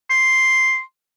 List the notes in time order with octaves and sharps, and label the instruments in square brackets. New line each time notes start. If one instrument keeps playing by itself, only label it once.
[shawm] C6